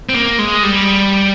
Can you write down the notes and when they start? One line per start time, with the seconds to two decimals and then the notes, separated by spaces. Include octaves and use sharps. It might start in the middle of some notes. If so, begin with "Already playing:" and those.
0.09 C4
0.14 A#3
0.39 G#3
0.63 G3